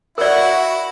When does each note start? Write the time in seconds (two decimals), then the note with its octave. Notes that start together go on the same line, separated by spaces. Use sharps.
0.18 E4 F#4 A#4 D5 F#5